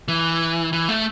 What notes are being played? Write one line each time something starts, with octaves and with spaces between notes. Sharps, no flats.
E3
E3
A3